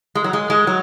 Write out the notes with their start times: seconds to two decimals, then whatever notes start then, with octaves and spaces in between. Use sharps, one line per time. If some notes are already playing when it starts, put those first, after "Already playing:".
0.15 G#3
0.24 F#3
0.33 G#3
0.50 G#3
0.67 F#3